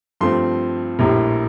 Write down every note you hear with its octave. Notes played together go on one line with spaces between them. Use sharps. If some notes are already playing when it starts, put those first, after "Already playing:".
G2 F3 A3 C4 C6
A#1 A2 G3 A#3